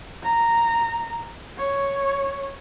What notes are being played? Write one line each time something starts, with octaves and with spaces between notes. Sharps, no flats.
A#5
C#5